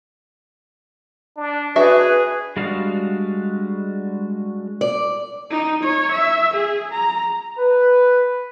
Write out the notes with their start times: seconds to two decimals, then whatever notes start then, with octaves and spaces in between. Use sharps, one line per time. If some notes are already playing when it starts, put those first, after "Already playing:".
1.36 D4
1.76 D4 F#4 G#4 B4 E5
2.57 G3 G#3 D4 F#4 F5
4.81 D5
5.51 D#4
5.84 C#5
6.13 E5
6.55 G#4
6.92 A#5
7.59 B4